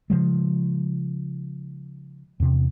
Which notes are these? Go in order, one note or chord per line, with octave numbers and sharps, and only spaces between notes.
C#3 F3 G#3
E2 C3